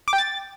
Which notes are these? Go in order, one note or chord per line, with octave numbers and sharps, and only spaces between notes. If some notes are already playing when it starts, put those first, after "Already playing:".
D6
G5
A6